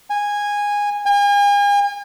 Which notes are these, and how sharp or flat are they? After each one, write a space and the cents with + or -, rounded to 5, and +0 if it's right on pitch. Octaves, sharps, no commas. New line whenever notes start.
G#5 -15
G#5 -40